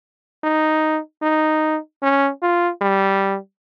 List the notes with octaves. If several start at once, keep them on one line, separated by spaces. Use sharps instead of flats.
D#4
D#4
C#4
F4
G3